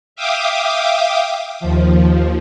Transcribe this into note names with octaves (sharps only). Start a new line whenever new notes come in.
E5 F5 G5 D6 D#6
D#2 F3